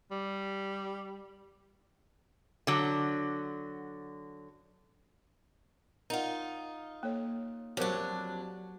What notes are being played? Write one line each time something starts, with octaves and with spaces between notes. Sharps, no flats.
G3
D3 F#3
D#4 F4 A#4 D5 F#5
A#3 A4 C#5
F2 F#3 D4 G4 A#4 C5 C#5